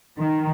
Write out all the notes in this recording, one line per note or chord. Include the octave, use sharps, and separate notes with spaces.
D#3